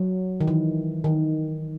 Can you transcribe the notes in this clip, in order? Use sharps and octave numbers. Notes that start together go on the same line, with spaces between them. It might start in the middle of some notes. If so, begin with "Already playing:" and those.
Already playing: F#3
D#3
E3
D#3